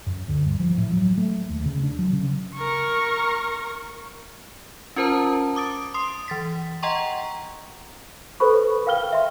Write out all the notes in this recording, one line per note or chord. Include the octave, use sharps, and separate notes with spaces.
F#2
D2
G2
F3
A2
F#3
A3
D#2
C#3
D4
F#3
C#3
A#4 C#6
C#4 F4 A#4 C5 A5 A#5
D6 D#6 A6 D7
C6 D#6 C7
E3 A6 B6
D#5 F#5 G5 A#5 C6 C#6
A4 B4 C5 B5 C#6
A#4 F5 G5 F6 G7
E5 C6